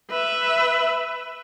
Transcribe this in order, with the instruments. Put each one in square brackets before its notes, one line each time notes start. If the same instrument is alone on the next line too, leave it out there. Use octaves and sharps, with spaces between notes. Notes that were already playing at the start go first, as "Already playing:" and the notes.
[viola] B4 E5